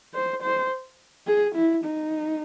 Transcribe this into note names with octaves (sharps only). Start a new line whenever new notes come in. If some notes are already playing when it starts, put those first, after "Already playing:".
C5
C5
G#4
E4
D#4